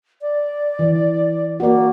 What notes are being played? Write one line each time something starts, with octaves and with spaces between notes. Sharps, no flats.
D5
E3
A#3 F#4 D5